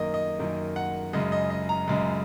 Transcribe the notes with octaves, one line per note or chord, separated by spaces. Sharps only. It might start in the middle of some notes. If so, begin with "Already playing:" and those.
Already playing: F#2 D#3 A#3 D#5
D#5
F#2 D#3 A#3
F#5
F#2 C#3 G#3 D#5
D#5
D#5
A#5
F#2 C#3 G#3